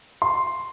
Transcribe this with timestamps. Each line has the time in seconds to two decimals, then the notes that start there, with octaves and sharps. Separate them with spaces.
0.22 C6